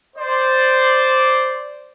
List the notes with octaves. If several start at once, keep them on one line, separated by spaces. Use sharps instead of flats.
C5 D5